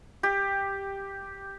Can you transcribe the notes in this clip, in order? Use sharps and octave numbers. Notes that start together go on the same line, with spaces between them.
G4